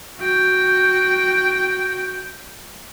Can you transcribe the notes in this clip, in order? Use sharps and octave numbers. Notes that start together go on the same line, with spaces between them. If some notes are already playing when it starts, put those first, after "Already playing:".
F#4 G5